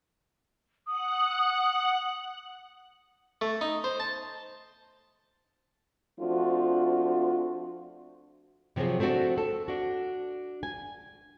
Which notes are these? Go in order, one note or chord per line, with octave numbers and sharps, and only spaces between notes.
F#5 D#6 F#6
A3
D#4
C5
A5
F3 A3 C4 D4 F4 F#4
C3 F3 F#3 C4 G#4
A3 C4 D4 F#4
A4
D4 F#4
G#5